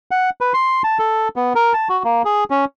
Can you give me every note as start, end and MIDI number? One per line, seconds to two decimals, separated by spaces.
0.11 0.30 78
0.41 0.53 71
0.54 0.82 84
0.84 0.98 81
0.99 1.28 69
1.36 1.53 59
1.55 1.73 70
1.74 1.88 81
1.89 2.03 66
2.05 2.22 58
2.25 2.44 68
2.50 2.65 61